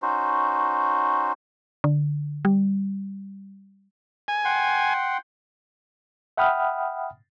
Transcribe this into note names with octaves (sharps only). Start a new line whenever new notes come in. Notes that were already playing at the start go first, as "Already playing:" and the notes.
C#4 D#4 F#4 C5
D3
G3
G#5
F#5 G5 C6
E5 F#5 G5 B5 D#6 F6